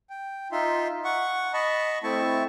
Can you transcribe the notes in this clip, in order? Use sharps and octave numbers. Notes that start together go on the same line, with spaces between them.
G5
D#4 F4 E5 C6
F#5 C#6
D#5 A5 B5 C#6
A3 C4 E4 A5 C#6